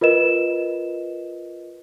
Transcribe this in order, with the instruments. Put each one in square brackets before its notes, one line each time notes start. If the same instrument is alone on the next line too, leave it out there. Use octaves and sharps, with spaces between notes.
[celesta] F4 A#4 B4 D#5 E7